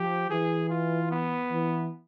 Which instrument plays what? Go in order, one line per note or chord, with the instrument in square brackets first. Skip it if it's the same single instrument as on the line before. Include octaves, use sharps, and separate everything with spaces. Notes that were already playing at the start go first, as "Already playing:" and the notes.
Already playing: [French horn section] F3 [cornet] G4
[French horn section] E3 [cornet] G#4
[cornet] F4
B3
[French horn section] E3